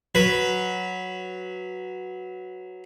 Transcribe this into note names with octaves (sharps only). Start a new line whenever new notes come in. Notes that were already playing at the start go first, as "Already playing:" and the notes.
F#3 B4